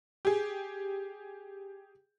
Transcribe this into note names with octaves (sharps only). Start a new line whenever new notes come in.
G4 G#4